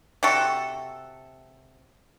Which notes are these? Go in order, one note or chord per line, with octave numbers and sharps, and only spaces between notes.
C3 F#4 A4